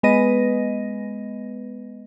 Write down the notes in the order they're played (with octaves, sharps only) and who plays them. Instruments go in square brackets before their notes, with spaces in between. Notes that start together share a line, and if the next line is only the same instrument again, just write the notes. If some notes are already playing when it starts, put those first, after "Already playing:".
[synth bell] G#3 B3 B4 D#5 A#6 D#7